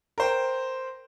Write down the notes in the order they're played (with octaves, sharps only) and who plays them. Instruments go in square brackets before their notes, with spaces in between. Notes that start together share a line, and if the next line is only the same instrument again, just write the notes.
[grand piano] A#4 C5 G5